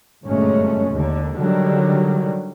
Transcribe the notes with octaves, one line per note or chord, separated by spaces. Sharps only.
G1 F#2 A#2 G#3 A3 C#4
D#2 D3
D3 D#3 F#3 G3